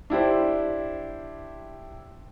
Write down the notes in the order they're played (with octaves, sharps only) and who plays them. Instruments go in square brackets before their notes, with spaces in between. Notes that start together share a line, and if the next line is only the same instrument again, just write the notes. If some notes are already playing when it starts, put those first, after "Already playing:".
[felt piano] D4 E4 G4 C5